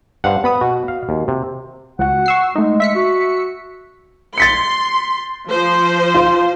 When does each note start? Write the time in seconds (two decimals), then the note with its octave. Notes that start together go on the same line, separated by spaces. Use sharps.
0.24 G2 C5 F5 F#5
0.44 B3 F#5 B5 D#6
0.61 B2 F#4
0.88 F5
1.09 D#2
1.28 C3
1.99 C#2 F#4 F#5
2.26 C#6 E6 C7
2.55 G#3 A3 D#4
2.80 E5 B6 C#7
2.95 F#4
4.38 C6 A6 B6 C#7
5.50 F3 C5
6.14 F4 F5